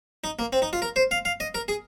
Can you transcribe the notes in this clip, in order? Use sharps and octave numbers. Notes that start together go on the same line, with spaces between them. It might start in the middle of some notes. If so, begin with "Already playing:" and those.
D#4
A#3
C4
D#4
F4
A#4
C5
F5
F5
D#5
A#4
G#4